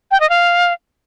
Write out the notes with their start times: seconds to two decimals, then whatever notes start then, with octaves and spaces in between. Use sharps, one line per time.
0.11 G5
0.20 D#5
0.30 F5